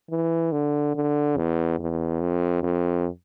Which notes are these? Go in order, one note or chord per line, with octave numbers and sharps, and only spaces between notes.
E3
D3
D3
E2
E2
F2
F2